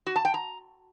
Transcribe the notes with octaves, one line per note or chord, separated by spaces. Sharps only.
F#4
A5
G5
A#5